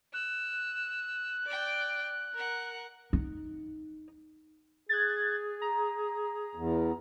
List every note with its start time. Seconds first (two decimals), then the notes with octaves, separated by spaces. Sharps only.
0.13 E6 F#6
1.45 D5 G5
2.34 A#4 F#5
3.13 D#4
4.89 G#4 F#6 G#6 A6
5.61 A#5
6.55 E2